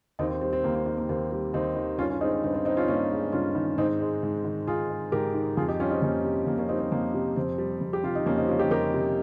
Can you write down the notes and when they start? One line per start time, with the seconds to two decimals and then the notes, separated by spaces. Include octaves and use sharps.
0.19 D#2 C4 D#4
0.30 C4
0.41 G3 C4
0.53 C4
0.64 D#2 A#3
0.75 C4
0.86 D#3 C4
0.98 A#3
1.09 D#2 C4
1.31 G3 C4
1.54 D#2 C4 D#4
1.76 D#3
1.98 G2 C#4 F4
2.10 C#4 F4
2.21 G#3 C4 D#4
2.32 C4
2.43 G2 C4
2.54 C4
2.65 D#3 C4 D#4
2.77 C#4 F4
2.88 G2 A#3 C#4
3.11 G#3
3.32 G2 C#4 F4
3.55 D#3
3.78 G#2 C4 D#4
4.00 G#3
4.23 G#2
4.45 D#3
4.67 G#2 F4 G#4
4.90 G#3
5.12 G#2 G4 A#4
5.34 D#3
5.57 F2 F4 G#4
5.68 D#4 G4
5.79 G3 C#4 F4
5.90 C4 D#4
6.02 F2 A#3 C#4
6.24 C3
6.46 F2 A#3
6.58 A#3 C#4
6.69 G3 C4 D#4
6.80 C4
6.92 F2 A#3
7.14 C3
7.36 F2 C4
7.58 G3
7.81 F2
7.93 G4
8.03 C3 F4
8.15 D#4
8.26 F2 A#3 C#4
8.37 C4 D#4
8.48 G3 C#4 F4
8.59 D#4 G4
8.71 F2 G4 A#4
8.94 C3